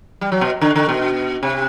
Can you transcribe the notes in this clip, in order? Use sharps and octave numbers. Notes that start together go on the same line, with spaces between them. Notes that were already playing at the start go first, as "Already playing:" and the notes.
G3
F#3
B2
D3
D3
B2
C3